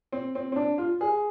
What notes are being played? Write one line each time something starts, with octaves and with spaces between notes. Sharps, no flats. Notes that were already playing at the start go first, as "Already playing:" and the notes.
C4
C4
C4
D4
F4
G#4